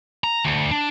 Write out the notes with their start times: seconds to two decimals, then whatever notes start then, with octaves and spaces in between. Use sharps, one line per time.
0.24 A#5
0.45 D2
0.71 D4